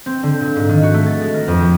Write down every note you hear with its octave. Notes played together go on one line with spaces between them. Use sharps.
C4
D3
A#2
G#2
D#3
F#4
A3
A6
G#3
A#4
F2
F3